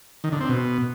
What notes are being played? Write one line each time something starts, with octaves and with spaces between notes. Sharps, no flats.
D#3
D3
C4
B2